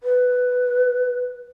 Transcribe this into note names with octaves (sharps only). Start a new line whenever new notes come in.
B4